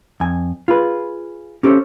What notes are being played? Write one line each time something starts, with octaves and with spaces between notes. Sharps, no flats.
F2 G#5
F4 G#4 B4
C#4 G4 A4 A#4 C5 C#5